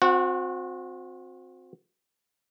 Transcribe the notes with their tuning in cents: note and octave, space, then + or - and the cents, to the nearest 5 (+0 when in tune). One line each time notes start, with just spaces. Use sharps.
C4 +0 F#4 -35 F#5 +0